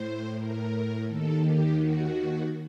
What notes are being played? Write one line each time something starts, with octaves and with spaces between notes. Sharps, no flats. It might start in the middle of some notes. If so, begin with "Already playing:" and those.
Already playing: A2 C5
A#4
D#2 D#3 A4
G4
F#4